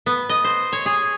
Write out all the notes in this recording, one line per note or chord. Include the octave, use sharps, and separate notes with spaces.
B3
D#5
C5
C#5
G#4